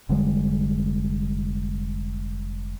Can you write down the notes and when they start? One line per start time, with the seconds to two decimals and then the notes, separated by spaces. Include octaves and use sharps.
0.09 F1 D3 G3 G#3